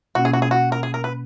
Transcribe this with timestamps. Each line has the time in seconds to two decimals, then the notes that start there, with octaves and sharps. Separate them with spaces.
0.15 B2 A#3 C#4 F#4
0.25 G#4
0.33 F#4
0.42 G#4
0.51 F#4
0.72 A#4
0.83 G#4
0.94 A#4
1.04 B4